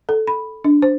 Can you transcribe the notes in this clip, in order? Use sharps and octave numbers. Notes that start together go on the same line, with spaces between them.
A4
B5
D4
C5